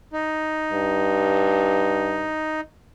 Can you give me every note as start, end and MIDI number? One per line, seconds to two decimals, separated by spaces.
0.13 2.61 63
0.73 2.31 43